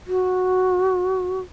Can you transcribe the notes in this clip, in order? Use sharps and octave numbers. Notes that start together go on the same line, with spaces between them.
F#4